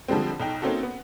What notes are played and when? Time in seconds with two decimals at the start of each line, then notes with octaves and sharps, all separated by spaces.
0.08 D3 F3 G3 G#3 C4
0.40 B1 D#4 G5
0.62 A#3 C4 C#4 D#4 F#4 A4
0.83 B3